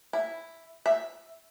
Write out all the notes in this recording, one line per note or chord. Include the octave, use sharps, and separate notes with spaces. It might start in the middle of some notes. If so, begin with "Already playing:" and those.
E4
E5